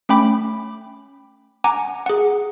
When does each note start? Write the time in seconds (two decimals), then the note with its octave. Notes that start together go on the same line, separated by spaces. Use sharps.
0.09 A3 C#4 G5 B5 D6
1.64 F#5 G#5 A#5 D6
2.06 G#4 F#5